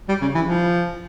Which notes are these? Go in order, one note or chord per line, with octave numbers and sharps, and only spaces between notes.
G3
C#3
E3
F3